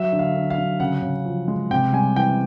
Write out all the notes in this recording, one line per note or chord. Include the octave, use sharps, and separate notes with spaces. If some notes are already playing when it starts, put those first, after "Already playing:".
Already playing: F#3 E5
D3
F5
D3
F5
F#3
C#3 F#5
C#3
F3
G#3
C3 G5
G3 G#5
E3 G5